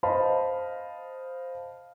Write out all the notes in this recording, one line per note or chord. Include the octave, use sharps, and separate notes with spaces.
C5 D#5 F5 A5 B5